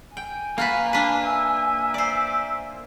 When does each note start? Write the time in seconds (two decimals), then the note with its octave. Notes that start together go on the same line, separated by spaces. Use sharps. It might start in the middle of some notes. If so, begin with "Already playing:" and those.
0.17 G5 G#5
0.58 A#3 F4 F#4 B4
0.93 D4 B4
1.25 E5
1.94 C5 D5